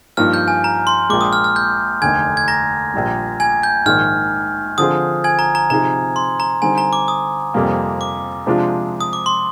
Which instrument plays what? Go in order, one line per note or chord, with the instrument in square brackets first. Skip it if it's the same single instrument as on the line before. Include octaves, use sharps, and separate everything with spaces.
[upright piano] G2 F3 A#3 D#4 [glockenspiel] F6
[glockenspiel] G6
G#5
A#5
C6
[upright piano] A#1 A#2 G#3 [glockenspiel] D6
[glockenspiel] D#6
F6
F6
G6
[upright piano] F1 D#2 D3 [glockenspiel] G#5 G#6
[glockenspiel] G#6
A#5 A#6
[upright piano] A#1 A#2 G3
[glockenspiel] G#5 G#6
G6
[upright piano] A#1 G#2 D#3 [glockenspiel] F6
[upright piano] D3 F3 C4 F4 G#4 [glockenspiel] D#6
[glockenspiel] G#5 G#6
A#5
A#5
[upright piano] C3 F3 C4 D#4 G#4 [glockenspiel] A#5
[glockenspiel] C6
A#5
[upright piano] D3 G3 C4 D#4 [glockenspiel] G#5
[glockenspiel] A#5
D6
D#6
[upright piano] F2 C3 G3 A#3
[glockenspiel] D6
[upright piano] C3 F3 G#3 D4 F4
[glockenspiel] D#6
D6
C6